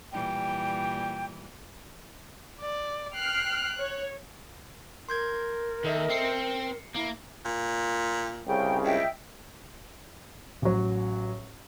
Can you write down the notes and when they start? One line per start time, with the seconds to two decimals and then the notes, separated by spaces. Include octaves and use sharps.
0.12 A#2 E3 G3 G5
2.60 D5
3.16 G5 F6 F#6 C7
3.79 C#5
5.09 A#4 C6 G6 G#6
5.85 D#2 A4 D#5 E5
6.10 C4 C7 C#7
6.95 A#3 E4
7.45 A#2
8.47 C2 C#3 G5
8.84 C#2 D#5 E5 G5
10.62 A1 F#3